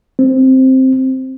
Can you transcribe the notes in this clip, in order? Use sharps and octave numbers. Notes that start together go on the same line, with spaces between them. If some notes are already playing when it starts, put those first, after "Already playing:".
C4